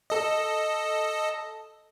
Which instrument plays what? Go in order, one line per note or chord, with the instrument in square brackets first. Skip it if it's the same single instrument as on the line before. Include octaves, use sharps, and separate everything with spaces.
[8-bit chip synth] A4 D#5